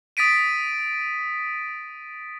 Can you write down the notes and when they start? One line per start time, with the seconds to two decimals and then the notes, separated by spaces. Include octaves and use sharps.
0.17 D#6 A6 B6 D7 D#7